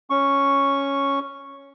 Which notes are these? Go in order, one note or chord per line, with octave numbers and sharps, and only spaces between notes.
C#4 C#6